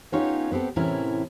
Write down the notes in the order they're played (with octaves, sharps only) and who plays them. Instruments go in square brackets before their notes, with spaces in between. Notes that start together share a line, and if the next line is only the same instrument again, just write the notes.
[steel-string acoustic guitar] B3 C#4 D#4 F4 G4 C#5
B3 C4 G4 A4
A2 C3 E3 C#4 E4 A#4